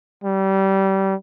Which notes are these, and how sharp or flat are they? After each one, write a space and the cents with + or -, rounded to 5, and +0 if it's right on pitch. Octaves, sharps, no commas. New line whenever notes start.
G3 -25